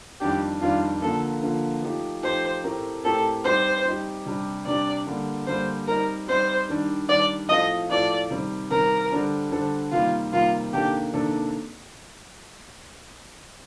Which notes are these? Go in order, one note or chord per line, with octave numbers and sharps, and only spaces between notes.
F2 D#3 G3 D4 G4
F2 D#3 G3 D4 F4
D3 F3 A#3 A4
D3 F3 A#3
F3 A3 D#4 G4
F3 A3 D#4 G4 C5
A2 A3 C4 G4 A#4
A2 A3 C4 G4 A4 A#4
G3 C4 D#4 G4 C5
G3 C4 D#4 G4
C3 G3 D4 G4
C3 G3 D4 G4 D5
D3 G3 A#3
D3 G3 A#3 C5
G3 C4 D#4 A#4
G3 C4 D#4 C5
D#3 G3 D4
D#3 G3 D4 D5
A2 F3 C4 F4 A4 D#5
A2 F3 C4 F4 A4 D5
C3 D#3 G3 C4
C3 D#3 G3 C4 A#4
D3 G3 D4 A4 C5
D3 G3 D4 A4 C5
C3 D#3 G3 A#3 F4
C3 D#3 G3 A#3 F4
C3 D#3 A#3 D4 G4 A4
C3 D#3 A#3 D4 A4